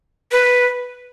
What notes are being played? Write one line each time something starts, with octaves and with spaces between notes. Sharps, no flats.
B4